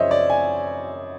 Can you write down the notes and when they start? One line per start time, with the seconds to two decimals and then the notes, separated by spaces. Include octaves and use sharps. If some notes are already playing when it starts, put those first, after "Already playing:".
Already playing: F#2 C#3 F3 C5 C#5 D#5 E5
0.11 D5
0.30 G#5